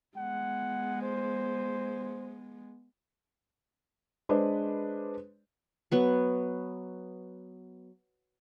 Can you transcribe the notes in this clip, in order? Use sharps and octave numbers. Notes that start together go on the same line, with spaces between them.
G#3 B3 F#5
C5
G#3 D4 B4 C5 D5
F#3 B3 C#6